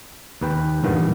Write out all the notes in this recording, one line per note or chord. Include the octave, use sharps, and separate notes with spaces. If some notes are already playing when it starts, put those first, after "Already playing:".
D#2 B4 G5
E2 G2 A#2 B3 G5